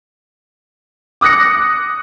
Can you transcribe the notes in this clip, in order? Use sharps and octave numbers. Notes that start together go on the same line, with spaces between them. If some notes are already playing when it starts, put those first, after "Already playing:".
D6 D#6 F#6 A#6 C#7